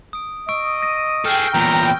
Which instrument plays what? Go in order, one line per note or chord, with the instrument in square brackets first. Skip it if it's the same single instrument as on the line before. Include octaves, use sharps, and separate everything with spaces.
[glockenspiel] D#6 D7
[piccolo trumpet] D#5 [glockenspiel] C#6 E6 D7
[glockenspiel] A#6 D#7
[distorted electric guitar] G#4 A4 [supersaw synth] G5 [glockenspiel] E6 F6
[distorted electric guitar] E2 A#2 [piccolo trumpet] A#5